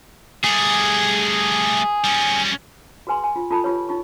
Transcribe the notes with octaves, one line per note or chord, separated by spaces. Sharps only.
G3 A3 G#4
G3 C#4
F#4 G#4 B4 G#5 C6
G#5
F4
F4 A4 A5 B5
F4 G4 B4 C#5
D#4 F4 C#6